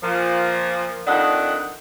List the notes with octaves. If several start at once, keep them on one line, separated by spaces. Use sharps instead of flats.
A#2 F3
F2 D#3 D4 D#5 F#5